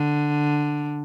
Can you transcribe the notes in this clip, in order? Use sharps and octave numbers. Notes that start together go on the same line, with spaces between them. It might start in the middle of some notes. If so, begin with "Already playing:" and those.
Already playing: D3